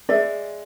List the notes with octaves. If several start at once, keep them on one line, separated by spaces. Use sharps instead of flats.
G#3 D5 E5